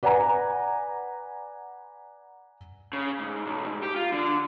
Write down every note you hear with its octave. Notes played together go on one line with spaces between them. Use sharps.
B4 D5 F#5 G#5 A#5
C#3
G#2
B1
G#2
G4
F4
D3